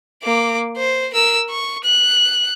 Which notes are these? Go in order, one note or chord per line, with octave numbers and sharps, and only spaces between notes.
A#3 D6
C5
A#4 E6
C#6
F#6